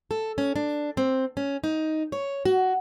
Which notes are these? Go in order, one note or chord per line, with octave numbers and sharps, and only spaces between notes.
A4
C#4
D4
C4
C#4
D#4
C#5
F#4